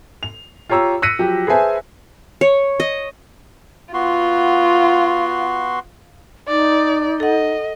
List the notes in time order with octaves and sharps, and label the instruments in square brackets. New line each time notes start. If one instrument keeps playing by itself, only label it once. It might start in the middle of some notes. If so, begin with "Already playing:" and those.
[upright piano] F7
F4 G4 C#5 A#5 E6
E6 F#6 A#6 B6 C#7 D#7
F3 F#3 G4
G#4 B4 C5 E5 G#5 A5
[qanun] C#5
D#5
[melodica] B3 F#4 C6 [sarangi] F4
[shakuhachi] D#4 [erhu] D5
[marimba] A4 F#5 [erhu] D#5